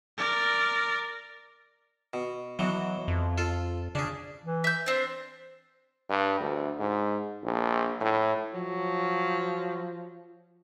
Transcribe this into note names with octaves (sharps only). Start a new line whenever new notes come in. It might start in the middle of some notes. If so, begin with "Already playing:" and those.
A#4 D5
B2
B2 E3 F#3
F2
F4 A4
C#3 D4 G#4
E3
E5 G6
C4 D4 C5
G2
D2
G#2
A#1
A2
F3 F#3